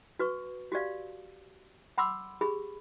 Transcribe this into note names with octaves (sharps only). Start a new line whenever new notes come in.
F#4 B4 C#6
F#4 G4 D5 F5
F#5 B5 C6 D6 E6
G4 G#4 B5